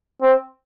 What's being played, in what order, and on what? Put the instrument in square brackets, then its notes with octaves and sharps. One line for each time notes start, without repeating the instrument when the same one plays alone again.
[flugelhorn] C4